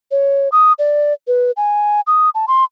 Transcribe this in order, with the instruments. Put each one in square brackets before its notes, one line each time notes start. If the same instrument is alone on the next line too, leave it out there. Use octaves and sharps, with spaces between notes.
[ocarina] C#5
D#6
D5
B4
G#5
D#6
A5
C6